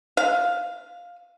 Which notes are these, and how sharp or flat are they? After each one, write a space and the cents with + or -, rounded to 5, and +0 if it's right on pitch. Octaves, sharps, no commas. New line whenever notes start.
F5 +10